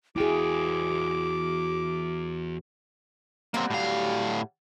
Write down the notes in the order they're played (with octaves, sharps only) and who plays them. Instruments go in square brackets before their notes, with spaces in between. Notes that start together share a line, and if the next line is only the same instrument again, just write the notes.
[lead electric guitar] E2 G5 [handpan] E4 G#4 [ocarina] F#4 [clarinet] D6
[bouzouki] F#3 G3 [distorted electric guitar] A#3 C4
[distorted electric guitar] A2 F5